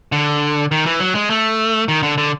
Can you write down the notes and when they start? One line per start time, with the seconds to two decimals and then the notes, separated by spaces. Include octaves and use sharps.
0.12 D3
0.71 D#3
0.86 E3
1.00 F#3
1.15 G#3
1.30 A3
1.88 D#3
2.03 D3
2.18 D3